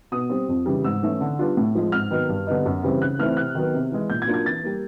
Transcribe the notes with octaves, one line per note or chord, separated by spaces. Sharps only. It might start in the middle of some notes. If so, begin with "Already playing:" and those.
B2 D#6
G3 C4
F2
C#3 E3 G3
G#2 E6
E3 A3 C#4 E4
D3
G3 B3 D4 F4
A2
F3 G#3
G#2 F6
D#3 F#3 B3 D#4
G2
D3 G3 B3 D#4
F#2
C#3 E3 G3 C4
C#3 F#6
E3 A3 C4 E4 F6
C3 F#6
D#3 F#3 B3
C3
E3 G#3
A#2 G6
G#6
F#3 A#3 D4 F4
G#6
E3 A6
G3 A#3